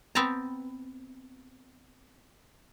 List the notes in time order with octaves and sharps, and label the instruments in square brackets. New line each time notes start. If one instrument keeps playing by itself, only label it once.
[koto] B3 C4 G5 A5 A#5